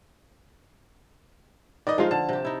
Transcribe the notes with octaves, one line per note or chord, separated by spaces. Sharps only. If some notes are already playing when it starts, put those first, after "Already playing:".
D#3 B4 D5 D#5
F3 G#3 D#4 F4 F5
D3 A5
C3 G4
D#4 E4